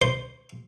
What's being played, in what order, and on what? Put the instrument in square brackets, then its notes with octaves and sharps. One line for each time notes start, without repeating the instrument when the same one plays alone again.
[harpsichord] C5